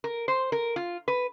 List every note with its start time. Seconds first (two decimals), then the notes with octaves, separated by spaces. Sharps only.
0.04 A#4
0.28 C5
0.52 A#4
0.76 F4
1.08 B4